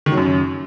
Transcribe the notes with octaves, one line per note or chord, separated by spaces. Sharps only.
D#3
F#3
F#2